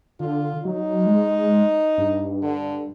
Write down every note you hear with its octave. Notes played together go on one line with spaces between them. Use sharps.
D3 F4
F#3 D#4
G#3
G2
D3